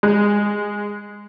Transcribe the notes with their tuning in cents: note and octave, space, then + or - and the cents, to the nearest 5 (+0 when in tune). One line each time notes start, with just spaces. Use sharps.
G#3 -15